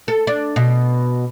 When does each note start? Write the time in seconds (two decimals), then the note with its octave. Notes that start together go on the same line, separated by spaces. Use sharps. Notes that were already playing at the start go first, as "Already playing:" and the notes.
0.08 A4
0.27 D4
0.56 B2